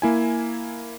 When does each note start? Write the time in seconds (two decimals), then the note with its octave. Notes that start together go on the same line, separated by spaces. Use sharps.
0.02 A#3 E4 G#5